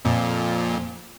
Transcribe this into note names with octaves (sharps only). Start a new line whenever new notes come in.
F2 A#2